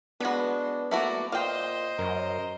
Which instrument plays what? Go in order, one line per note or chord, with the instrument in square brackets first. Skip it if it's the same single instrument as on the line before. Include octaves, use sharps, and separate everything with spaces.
[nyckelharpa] G#3 C6 [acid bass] B3 [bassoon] D4 [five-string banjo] F#4 B4
[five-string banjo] A3 E4 F#4 [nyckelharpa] A#3 D5
[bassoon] A#2 [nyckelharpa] C5 D#5 [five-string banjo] F5 G5
[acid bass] F#2 [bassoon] A#4